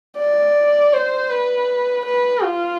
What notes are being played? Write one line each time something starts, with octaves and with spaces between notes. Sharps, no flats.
D5
C5
B4
B4
F4